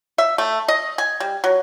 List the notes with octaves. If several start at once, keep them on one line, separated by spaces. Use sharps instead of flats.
E5
A3
D#5
G#5
G3
F#3